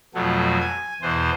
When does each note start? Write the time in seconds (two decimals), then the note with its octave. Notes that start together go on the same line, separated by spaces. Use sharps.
0.15 F2 B2 F#3 A3
0.60 G#5
1.02 E2 B2 E3 C5